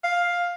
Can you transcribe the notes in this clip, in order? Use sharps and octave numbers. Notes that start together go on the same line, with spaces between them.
F5